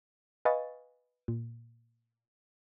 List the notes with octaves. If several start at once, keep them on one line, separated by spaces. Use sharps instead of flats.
B4 D#5 F5 G#5 C#6 A6
A#2